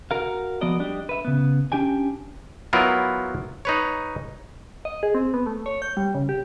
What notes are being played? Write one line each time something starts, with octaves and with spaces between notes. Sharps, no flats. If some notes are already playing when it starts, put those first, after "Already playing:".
F#4 A#4 F5
F3 B3 F#4 D5 D#5
G3 D4 G4 D#5
B4 E5
C#3 B3
C#4 D4 G4 G5 G#5
F#3 B3 E4 F4 A#4
D#4 B4 C#5
D#5
G#4
C4
B3
A3
C#5
G6
G3
C#3
G4